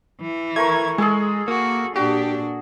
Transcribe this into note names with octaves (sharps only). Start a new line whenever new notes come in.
E3
A3 A#4 C#6 G#6
G#3 G#4 A4 G#5
A#3 F#4
A#2 D4 F#4 G4